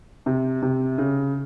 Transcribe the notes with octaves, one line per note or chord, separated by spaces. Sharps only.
C3
C3
C#3